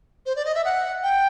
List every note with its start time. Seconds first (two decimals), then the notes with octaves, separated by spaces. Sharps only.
0.26 C5
0.36 D5
0.45 D#5
0.55 E5
0.65 F#5
1.03 G5